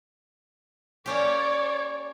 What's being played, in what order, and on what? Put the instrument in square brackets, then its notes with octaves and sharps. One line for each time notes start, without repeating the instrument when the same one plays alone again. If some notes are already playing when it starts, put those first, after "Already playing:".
[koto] A#3 C#4 G4 [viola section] C#5 D5